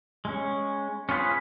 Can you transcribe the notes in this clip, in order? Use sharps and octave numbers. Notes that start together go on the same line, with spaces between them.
G#3 C#4
C#4 F4 G#4 B4 C5